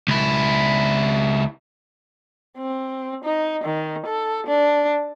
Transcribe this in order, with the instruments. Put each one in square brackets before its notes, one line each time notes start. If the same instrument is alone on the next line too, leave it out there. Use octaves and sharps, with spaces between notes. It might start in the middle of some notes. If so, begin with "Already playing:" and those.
[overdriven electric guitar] C#2 E4
[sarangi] C4
D#4
D#3
A4
D4